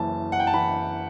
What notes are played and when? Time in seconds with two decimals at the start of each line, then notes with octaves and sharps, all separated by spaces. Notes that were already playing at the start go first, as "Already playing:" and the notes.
Already playing: F#1 F#2 E3 A5
0.32 F#5
0.40 G5
0.47 A5
0.54 E3 B5